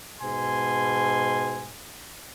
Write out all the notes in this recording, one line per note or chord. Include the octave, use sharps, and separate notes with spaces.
G#2 B2 G#5 C6